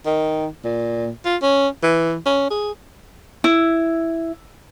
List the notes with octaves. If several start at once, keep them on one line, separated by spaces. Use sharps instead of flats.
D#3
A#2
F4
C#4
E3
C#4
G#4
E4